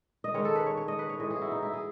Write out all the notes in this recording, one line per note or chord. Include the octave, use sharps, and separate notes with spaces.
D#5
D#3 G#3 C#4 C#5
A4
B4
C#5
C#5
D#5
B4
C#5
A2 E3 G#3 D#5
G#4
F#4
E4
D#4
E4
G#4